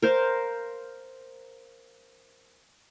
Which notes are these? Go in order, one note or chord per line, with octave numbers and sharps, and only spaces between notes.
A#4 C5 F5